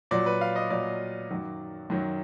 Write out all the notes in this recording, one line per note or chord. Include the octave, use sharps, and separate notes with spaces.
A#2 F#3 D5
B4
F5
D#5
A#2 F#3 D5
F#2 D#3 F#3
F#2 D#3 F#3